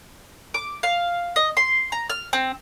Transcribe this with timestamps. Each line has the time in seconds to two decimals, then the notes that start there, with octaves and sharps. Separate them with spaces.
0.54 D6
0.83 F5
1.36 D#5
1.57 C6
1.92 A#5
2.10 F6
2.33 C4